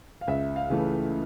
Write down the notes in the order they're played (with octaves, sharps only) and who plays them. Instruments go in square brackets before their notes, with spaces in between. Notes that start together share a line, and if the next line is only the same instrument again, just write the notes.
[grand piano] F5
C#2 E5
F5
C#3 E3 A3